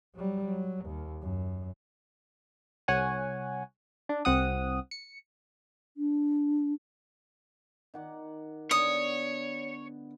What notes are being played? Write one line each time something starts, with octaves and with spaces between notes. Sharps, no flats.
F#3 G3
F#3
D#2
F#2
C2 C#5 F#5 G#5
D4
C2 C4 F#5 D#6
C#7
D4
D#3 F#5 D6
D3 B3 C#5 D#6